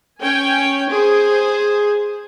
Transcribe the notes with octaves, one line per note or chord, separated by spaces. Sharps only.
C#4 C#5 G5 G#5
G#4 C5